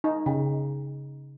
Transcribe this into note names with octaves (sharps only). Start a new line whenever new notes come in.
D#4
C#3